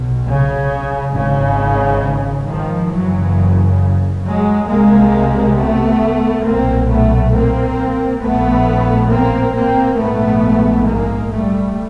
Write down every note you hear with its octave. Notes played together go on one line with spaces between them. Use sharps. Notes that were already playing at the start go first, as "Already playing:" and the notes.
Already playing: B1 B2
C#3
G#1 G#2 C#3
D#3 F3
F#1 F#2 C#3 E3 F#3
F#3 G#3
C2 C3 G#3 A#3
A3 B3
B1 A#2 A#3 C4
A3 B3
A#3 C4
A#1 A2 A3 B3
A#3 C4
A#3 C4
A#1 G#2 A3 B3
G#3 A#3
G3 A3